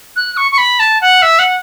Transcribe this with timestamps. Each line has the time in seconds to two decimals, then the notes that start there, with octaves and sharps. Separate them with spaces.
0.16 F#6
0.37 C#6
0.51 C#6
0.58 B5
0.79 A5
1.01 F#5
1.22 E5
1.39 F#5